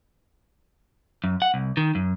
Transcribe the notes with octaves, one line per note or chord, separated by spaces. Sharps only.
F#2
F#5
C2
D#3
F#2